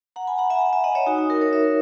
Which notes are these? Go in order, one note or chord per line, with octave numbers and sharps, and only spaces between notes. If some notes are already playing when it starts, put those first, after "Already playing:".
F#5 A#5
G#5 B5
F#5 A#5
E5 G#5
F#5 A#5
E5 G#5
D#5 F#5
C#5 E5
D#4 F#4
D#4
F#4 A#4
A#4 C#5
C#5 E5